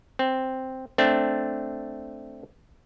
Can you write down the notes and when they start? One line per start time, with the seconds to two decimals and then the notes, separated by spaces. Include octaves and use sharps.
0.19 C4
0.98 A3 C4 D4